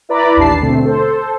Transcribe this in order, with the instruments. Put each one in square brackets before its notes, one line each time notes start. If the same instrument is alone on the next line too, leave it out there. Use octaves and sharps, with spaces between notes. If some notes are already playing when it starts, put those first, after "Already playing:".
[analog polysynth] E4 B4 D5 A#5 B5
A1 D#2 D4 G4 A5 C7
B2 D3 A3 C4
A4 C5